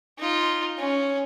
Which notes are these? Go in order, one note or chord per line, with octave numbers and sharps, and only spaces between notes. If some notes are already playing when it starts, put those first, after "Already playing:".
D#4 F4
C#4